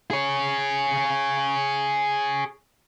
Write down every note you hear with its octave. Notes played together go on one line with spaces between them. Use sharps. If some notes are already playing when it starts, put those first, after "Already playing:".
G#4 C#5